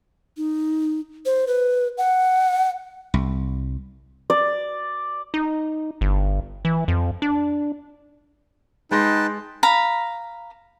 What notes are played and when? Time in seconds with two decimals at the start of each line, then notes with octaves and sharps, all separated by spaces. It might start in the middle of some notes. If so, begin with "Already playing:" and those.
0.37 D#4
1.26 C5
1.47 B4
1.98 F#5
3.14 C2
4.30 D5
5.34 D#4
6.01 G1
6.65 E3
6.88 F2
7.22 D4
8.91 G#3 D#4 B4 G5 A5 C6 A#6
9.63 F5 A#5 B5